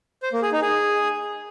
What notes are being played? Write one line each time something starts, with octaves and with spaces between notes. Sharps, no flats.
C5
A#3
G#4
D#4
G#4